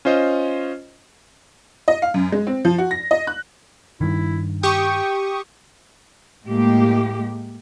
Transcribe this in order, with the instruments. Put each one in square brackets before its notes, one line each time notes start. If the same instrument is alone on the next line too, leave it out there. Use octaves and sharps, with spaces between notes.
[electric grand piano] C#4 F4 C5 D#5
[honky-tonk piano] D#5
F5
F#2
G#3
C4
F3
F#4
A#6
D#5
F#6
[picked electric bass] G2 D#3 [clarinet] E4
[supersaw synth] G4 C#6 D#6 [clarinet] G5
[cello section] A2 G#3 A#3 G4